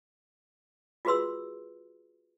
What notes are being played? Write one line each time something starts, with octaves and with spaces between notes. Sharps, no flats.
F4 F#4 G#4 B4 C6 E6